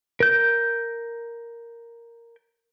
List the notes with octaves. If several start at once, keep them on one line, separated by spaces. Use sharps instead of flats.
A#4 G6